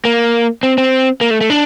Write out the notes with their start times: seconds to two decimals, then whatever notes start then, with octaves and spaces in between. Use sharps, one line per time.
0.05 A#3
0.63 C4
0.78 C4
1.21 A#3
1.30 A3
1.41 A3
1.50 D4